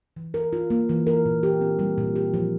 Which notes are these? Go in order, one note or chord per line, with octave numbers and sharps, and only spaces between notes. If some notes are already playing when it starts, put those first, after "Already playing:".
E3
A#4
F4
A#3
E3
A#4
A#2
G4
C4
G3
A#2
G4
F3